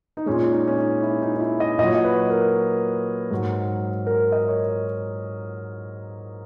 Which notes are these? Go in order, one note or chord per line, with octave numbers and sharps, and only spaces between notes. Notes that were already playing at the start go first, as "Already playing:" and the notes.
D#4
A#2 G#3 C#4
D#4
C#4
D#4
E4
D#4
D#4
E4
D#5
A#2 F#3 C#5 D#5
D#5
B4
A#4
G#2 F#3
A#4
D#5
C#5